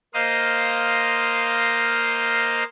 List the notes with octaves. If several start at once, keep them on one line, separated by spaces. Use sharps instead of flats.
A#3 C5 D#5 F5